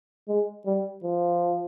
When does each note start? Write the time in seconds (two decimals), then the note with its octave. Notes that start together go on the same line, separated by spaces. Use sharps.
0.28 G#3
0.66 G3
1.04 F3